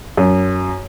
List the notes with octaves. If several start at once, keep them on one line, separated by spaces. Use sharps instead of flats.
F#2